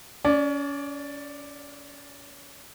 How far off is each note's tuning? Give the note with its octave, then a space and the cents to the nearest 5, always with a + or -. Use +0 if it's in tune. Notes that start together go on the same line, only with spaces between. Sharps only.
C#4 +30 D5 +0